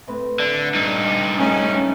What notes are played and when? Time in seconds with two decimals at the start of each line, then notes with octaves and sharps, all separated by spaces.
0.07 A2 C4 B4
0.39 D3
0.75 G2 D#4
1.39 A3 C#4 E4 C#5